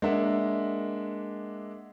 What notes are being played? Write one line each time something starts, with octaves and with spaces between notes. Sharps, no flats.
G#3 A#3 D4 E5 F#5